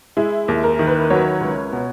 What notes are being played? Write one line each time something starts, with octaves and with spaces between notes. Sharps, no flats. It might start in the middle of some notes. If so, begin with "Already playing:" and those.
G#3 E4
D#2
A#4
D#3
B4
F#3 C#5
C#2
B2